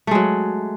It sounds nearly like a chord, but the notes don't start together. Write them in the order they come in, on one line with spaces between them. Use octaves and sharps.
A3 G#3 F#3